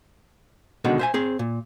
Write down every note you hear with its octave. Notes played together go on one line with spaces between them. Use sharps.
B2 D3 D#3 G#3
C5 E5 G#5
C4 G#4
A#2